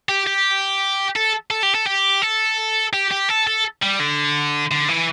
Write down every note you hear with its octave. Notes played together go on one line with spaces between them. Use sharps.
G4
G4
A4
A4
G4
A4
G4
A4
G4
G4
A4
A4
G3
D3
D3
E3